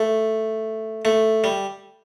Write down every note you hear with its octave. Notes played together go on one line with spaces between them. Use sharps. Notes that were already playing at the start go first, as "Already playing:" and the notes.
Already playing: A3
A3
G3